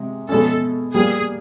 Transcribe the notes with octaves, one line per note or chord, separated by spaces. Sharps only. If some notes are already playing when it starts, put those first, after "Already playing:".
Already playing: C3 G#3
B2 G#3 C#4 A4
A#2 G3 A#3 G#4